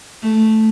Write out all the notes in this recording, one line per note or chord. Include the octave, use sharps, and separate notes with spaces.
A3